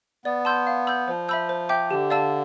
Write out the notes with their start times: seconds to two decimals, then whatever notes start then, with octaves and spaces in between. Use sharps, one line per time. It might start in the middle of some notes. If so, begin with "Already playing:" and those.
0.25 B3 D5
0.45 A5 C6 E6 G6
0.67 F5
0.87 B5 E6 G6
1.08 F3 C5
1.29 E5 B5 E6 G6
1.49 C5
1.69 E5 G5 D6 G6
1.91 D3 G4
2.10 D5 F5 A5 E6